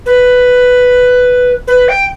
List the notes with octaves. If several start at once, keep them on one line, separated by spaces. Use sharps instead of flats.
B4
B4
G5